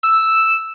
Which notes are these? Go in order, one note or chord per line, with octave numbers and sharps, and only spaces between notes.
E6